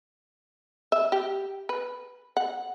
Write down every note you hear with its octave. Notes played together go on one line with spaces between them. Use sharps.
E5
G4
B4
F#5